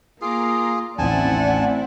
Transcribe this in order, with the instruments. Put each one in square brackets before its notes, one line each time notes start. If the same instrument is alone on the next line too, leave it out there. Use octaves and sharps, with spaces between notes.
[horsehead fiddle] A#3 [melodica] F4 G#4 [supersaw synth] A#5 D6 C7
[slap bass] A1 D#2 [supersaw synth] C4 E4 [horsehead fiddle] D5 F#5 [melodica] G#5 A5